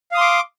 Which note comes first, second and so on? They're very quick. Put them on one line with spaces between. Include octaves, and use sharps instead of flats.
F5 D#6 C6 D6